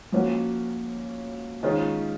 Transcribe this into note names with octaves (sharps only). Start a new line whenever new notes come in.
F3 A#3 C#4 F#4
D#3 G#3 C#4 F4